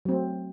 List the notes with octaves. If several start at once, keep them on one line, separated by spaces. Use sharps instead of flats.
F#3 A3 C4